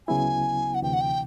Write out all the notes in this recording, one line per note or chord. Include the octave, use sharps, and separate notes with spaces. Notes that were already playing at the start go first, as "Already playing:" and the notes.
D2 C#3 F#3 B3 E4 G#5
F#5
D2 C3 E3 G5
F#5
G5